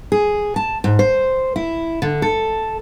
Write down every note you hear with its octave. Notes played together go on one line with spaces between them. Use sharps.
G#4
A5
G#2
C5
E4
D3
A4